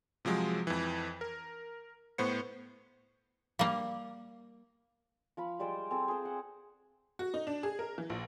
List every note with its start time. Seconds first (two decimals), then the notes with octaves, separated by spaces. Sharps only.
0.25 C3 F3 F#3 G#3
0.67 F2 E3
1.21 A#4
2.18 A2 B3 C5 C#7
3.59 G3 A#3 A#4 F5
5.37 F3 F5 B5
5.59 G3 G#3 C5 D5
5.91 C4 G#4 A4
6.08 G#4 C5
6.25 F#5
7.19 F#4
7.34 D#4
7.47 D4
7.63 G#4
7.79 A#4
7.98 E3
8.10 A#1